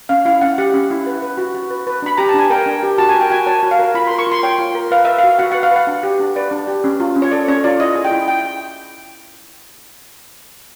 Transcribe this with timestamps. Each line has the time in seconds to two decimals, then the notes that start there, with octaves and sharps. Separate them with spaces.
0.09 C#4 F5
0.25 E4 F5
0.41 C#4 F#5
0.58 G4 F#5
0.74 C#4
0.90 E4
1.07 B4
1.22 B4
1.38 F#4
1.55 F#4
1.71 B4
1.87 B4
2.02 D4 B5
2.17 G4 A#5
2.29 A5
2.34 D4 G#5
2.50 A#4 G5
2.66 D4
2.83 G4
2.98 F#4 A5
3.09 G#5
3.14 A#4
3.21 G5
3.30 F#4 G#5
3.47 C#5 A5
3.63 F#4
3.71 F5
3.79 A#4
3.94 F4 B5
4.07 C6
4.11 A#4
4.19 C#6
4.27 F4 C6
4.43 C#5 G5
4.58 F4
4.75 A#4
4.91 B4 F5
5.05 B4 E5
5.18 F5
5.24 F#4
5.39 F#4 F#5
5.52 F#5
5.55 B4
5.63 F5
5.71 B4 F#5
5.87 D4
6.03 G4
6.20 D4
6.36 B4 D5
6.51 D4
6.67 G4
6.84 C#4
7.00 F4
7.16 C#4
7.22 C#5
7.31 A4 D5
7.48 C#4 C#5
7.64 F4 D5
7.80 E4 D#5
7.96 G#4
8.04 G5
8.12 E4
8.28 G5